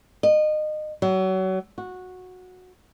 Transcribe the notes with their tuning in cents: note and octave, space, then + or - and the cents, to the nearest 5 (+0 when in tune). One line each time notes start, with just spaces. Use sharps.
D#5 -25
F#3 +30
F#4 -15